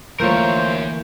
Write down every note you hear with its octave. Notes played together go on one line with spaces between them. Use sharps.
D2 E3 A3 A#3 F4 A#4 C5 C#5